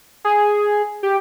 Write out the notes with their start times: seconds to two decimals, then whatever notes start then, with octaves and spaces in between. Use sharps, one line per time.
0.25 G#4
1.03 G4